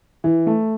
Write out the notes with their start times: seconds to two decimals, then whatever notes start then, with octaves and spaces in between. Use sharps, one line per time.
0.24 E3
0.47 A3